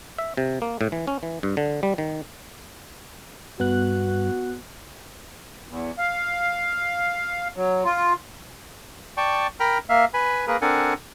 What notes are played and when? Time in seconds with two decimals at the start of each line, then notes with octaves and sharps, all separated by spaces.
0.18 E5
0.37 C3
0.62 A#3
0.81 A2
0.92 E3
1.07 C#4
1.23 E3
1.43 G2
1.57 D3
1.83 G3
1.98 D#3
3.60 G2 B3 F#4 F#6
5.68 E2
5.98 F5
7.56 F#3
7.85 F4
9.17 D5 G5 A5 C#6
9.60 A#4 G5 A#5 B5 F6
9.89 A#3 E5 F5
10.14 B4 G#5 B5
10.48 A#3 G#4 A#4 B4
10.62 C4 D4 A4 A#4 F#5 G#5